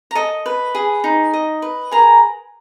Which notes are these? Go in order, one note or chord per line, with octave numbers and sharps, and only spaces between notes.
A#5
A4 D#5 A5
B4
G#4
D#4
D#5
B4
G#4 A#4 A#5